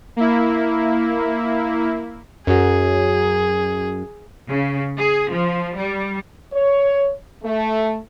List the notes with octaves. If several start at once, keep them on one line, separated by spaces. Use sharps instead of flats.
A#3 E4
F#2 F#3 G#4
C#3
G#4
F3
G3
C#5
A3